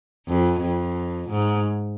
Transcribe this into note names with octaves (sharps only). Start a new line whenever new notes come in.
F2
F2
G#2